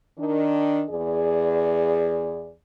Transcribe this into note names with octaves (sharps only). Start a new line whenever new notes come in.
D#3 D4
E2 G#4 D5